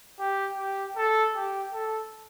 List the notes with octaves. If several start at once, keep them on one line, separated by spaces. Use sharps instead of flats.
G4
G4
A4
G4
A4